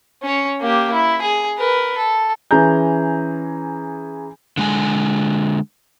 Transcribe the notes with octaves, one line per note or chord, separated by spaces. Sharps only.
C#4 C#5
A#3 G4
E4
G#4
A#4 B4
A4
E3 C#4 G#4 A#5 G6
D3 G#3 G#5